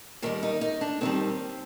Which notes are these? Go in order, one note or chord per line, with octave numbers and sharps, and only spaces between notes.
D#2 D#3 G3 A#4
D#4
D#4
D4
D#2 D#3 G3 C4